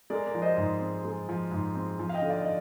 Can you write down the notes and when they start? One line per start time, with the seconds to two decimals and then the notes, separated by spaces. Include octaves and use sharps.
0.10 G#3 A#4 D5
0.27 A#4 D5
0.35 F3
0.42 C5 D#5
0.57 G#2
0.81 C4
1.05 G#3
1.29 F3
1.52 G#2
1.75 C4
1.99 F3
2.09 F5
2.14 D#5 G5
2.22 D3
2.30 D5 F5
2.42 D#5
2.45 D5